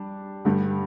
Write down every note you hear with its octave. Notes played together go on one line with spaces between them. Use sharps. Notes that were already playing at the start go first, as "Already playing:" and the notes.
Already playing: G3 D4
G2 D3 G3